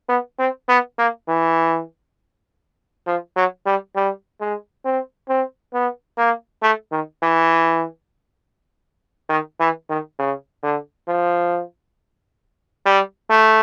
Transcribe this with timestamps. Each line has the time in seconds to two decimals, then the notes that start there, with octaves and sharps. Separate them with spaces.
0.09 B3
0.39 C4
0.69 B3
0.99 A#3
1.28 E3
3.07 F3
3.36 F#3
3.66 G3
3.96 G3
4.41 G#3
4.85 C4
5.29 C4
5.74 B3
6.18 A#3
6.63 A3
6.92 D#3
7.23 E3
9.29 D#3
9.60 E3
9.90 D#3
10.19 C#3
10.63 D3
11.08 F3
12.86 G3
13.30 A3